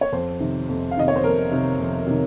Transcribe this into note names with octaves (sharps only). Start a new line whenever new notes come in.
C#5
F2 C5
C3 D#3
F2
F5
C3 D#3 D#5
C#5
C5
F2 A#4
C3 D#3
F2
C3 D#3